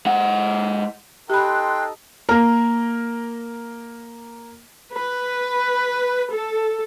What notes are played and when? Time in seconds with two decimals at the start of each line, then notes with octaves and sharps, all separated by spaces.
0.06 G#3 F#5
1.30 D#4 G4 A4 G5 B5 C6 F#6
2.29 A#3 A#4
4.91 B4
6.31 A4